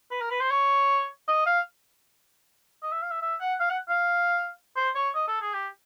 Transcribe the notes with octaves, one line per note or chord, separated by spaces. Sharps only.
B4
A#4
B4
C5
C#5
D#5
F5
D#5
E5
F5
E5
E5
F#5
F5
F#5
F5
C5
C#5
D#5
A4
G#4
G4